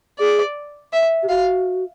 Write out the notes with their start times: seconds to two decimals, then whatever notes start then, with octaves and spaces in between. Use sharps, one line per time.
0.19 G#4 D5
0.93 E5
1.23 G4
1.29 F#4 F5